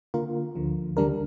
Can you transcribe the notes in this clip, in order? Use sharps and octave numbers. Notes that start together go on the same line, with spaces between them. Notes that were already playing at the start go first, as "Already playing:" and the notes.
D3 A#3 F4 A#4
D2 D3 F3
D2 D3 G3 D4 A#4